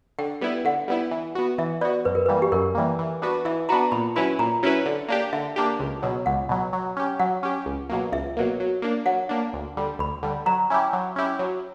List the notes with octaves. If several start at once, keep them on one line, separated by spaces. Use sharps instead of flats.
D3 G5
G3 B3 E4
D3 F#5
G3 B3 E4
E3
B3 F#4
E3 E5
B3 F#4 D5
F#2 B4
A#4
E3 G3 A#3 B4
G4
F#2 A#4
E3 G3 A#3
E3
B3 D4 F#4 B4
E3 E5
B3 D4 F#4 B4 A#5
A#2 B5
F#3 C#4 E4 B4 B5
A#2 A#5
F#3 C#4 E4 B4
D3
A#3 D4 G4
D3 E5
A#3 D4 G4
C#2
B2 F#3
C#2 F#5
B2 F#3
F#3
C#4 G4
F#3 F#5
C#4 G4
C#2
B2 F#3 A#3
C#2 E5
B2 F#3 A#3
F#3
A#3 D4
F#3 F#5
A#3 D4
D2
D3 G3
D2 B5
D3 G3
F#3 A#5
C#4 E4 G4
F#3
C#4 E4 G4
F#3